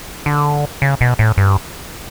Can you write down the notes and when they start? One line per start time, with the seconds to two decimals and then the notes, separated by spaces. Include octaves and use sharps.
0.26 D3
0.82 C#3
1.01 B2
1.19 A2
1.37 G2